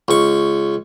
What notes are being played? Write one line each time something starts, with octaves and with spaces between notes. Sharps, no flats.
C#2 C#6